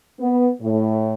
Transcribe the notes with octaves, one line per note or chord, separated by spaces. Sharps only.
B3
A2